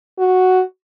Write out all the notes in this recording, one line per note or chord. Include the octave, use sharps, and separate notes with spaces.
F#4